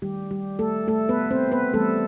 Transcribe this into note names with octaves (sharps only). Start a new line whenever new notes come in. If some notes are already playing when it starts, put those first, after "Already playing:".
D#3 G3 A3 G4
G3 G4
A3 A4
A3 A4
B3 B4
C4 C5
B3 B4
E3 G3 A3 B3 A4